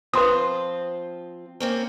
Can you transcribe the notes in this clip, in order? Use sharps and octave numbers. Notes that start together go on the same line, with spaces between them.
F3 C4 F4 B4 C6 D#6
A#3 C4 C#4